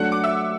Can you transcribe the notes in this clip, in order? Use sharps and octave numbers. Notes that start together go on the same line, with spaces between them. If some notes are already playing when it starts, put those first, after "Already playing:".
Already playing: F#3 A3 D4 F#5 F#6
D6
E5 E6